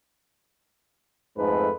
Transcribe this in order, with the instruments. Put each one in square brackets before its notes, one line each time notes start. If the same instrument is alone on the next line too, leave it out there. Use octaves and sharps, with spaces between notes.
[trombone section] F2 A3 B4 [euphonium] G#2